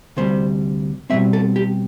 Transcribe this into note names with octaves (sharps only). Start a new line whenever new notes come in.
D2 C3 G3 C5
B2 G3 C4 E5
A4
G4